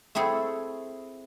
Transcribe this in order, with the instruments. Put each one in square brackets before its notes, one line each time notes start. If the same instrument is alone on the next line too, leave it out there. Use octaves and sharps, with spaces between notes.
[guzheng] A3 C4 E4 G#4 A4